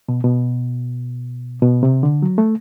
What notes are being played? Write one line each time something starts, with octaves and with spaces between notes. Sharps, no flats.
B2
B2
B2
C3
D3
F#3
A3